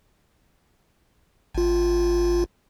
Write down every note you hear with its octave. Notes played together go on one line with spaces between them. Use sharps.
G#1 F4